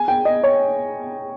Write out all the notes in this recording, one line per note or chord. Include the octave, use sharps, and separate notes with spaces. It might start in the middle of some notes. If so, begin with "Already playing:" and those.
Already playing: G#5
G5
D#5
C#5